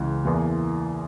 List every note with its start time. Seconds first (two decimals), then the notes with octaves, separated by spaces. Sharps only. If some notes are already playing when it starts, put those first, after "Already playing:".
Already playing: C#2 C#3 E3
0.25 E2 E3 A#3